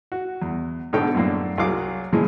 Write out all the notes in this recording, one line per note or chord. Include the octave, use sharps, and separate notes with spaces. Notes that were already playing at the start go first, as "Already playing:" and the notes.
F#4
E2
G#2 B2 D3 A4 C#5 G5
F#2 A2 A#3 D4
C2 F#3 G#4 F5 D6
A#2 C#3 E3 F3 G#3